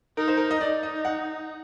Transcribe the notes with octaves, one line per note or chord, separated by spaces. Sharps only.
D#4 A#4
C5
A#4
D#5
D#4 D5
D#5
F#5